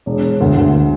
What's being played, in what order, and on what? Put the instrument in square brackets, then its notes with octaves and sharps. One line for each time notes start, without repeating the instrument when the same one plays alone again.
[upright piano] E1
E1
D2
D2